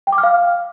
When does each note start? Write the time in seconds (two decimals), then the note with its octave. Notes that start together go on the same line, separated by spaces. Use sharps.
0.07 G5
0.13 D6
0.18 F6
0.23 F5